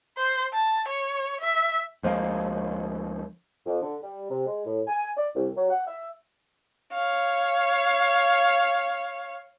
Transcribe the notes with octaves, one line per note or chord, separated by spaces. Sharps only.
C5
A5
C#5
E5
D2 F3 G#3 A#3
F2
D3
G3
C3
G#3
A2
G#5
D5
C2
F#3
F#5
E5
C#5 F5